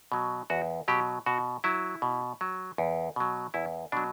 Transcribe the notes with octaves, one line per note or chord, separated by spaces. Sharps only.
B2 F#3
E2 F#4
B2 F#3 G4
B2 F#4
F#3 E4
B2
F#3
E2
B2 F#3
E2 E4
B2 F#3 D4